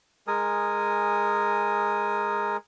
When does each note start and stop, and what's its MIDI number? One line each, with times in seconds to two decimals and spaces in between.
0.28 2.57 56
0.28 2.57 70
0.28 2.57 80
0.28 2.57 87